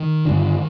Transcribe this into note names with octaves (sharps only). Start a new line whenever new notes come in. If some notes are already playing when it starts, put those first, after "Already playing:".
Already playing: D#3
G2 D3